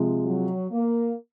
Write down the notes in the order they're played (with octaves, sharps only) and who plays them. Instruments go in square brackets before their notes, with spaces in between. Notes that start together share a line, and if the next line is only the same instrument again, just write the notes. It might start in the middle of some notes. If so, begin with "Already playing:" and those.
Already playing: [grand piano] C3 F3 G#3
[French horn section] F#3
A#3